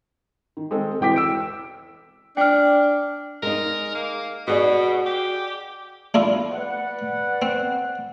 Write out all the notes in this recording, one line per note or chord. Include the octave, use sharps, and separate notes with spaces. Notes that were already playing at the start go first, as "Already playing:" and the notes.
D#3
G#3 C4 A4
E1 E3 G5 D6 B6
E6 D7
E6
D4 G5 F6
G#3 D#4 A#4
A#3
B2 F#4 G#4 D5
G4
D4 E4 F4
B4 D5 F#5
C4